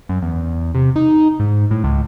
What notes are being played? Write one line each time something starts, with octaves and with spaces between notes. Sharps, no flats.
F#2
E2
C3
D#4
G#2
A2
C#2